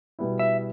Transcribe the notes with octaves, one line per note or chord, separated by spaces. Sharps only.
B2 G3 B3 E4
E5